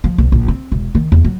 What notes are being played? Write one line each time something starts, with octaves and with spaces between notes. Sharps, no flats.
F3
B1
A#1
C4
E1
D#3
E2
F#3